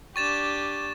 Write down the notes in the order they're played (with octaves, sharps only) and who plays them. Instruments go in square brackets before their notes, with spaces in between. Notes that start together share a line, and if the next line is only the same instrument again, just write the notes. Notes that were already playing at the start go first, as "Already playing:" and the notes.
[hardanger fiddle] D4 G4 [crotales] C#6 A6 E7